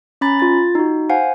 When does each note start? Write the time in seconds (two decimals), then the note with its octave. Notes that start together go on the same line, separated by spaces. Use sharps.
0.21 C#4 A#5 B5 A6
0.40 F4 A6
0.75 D#4 F#4
1.09 C5 F5 F#5 G#5